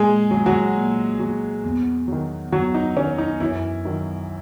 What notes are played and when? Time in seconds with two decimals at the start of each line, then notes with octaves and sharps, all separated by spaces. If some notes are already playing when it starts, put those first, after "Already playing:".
Already playing: A#2 G#3 G#4
0.31 F#3
0.46 F#3 F#4
0.76 A#2
1.20 F#3
1.64 E2
2.08 D#3 F#3
2.52 E2 F#3 F#4
2.74 D#4
2.97 D#3 F#3 C#4
3.18 D#4
3.40 F#2 E3 E4
3.85 D#3 F#3